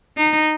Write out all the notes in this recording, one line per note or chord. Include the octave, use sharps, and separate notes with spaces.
D#4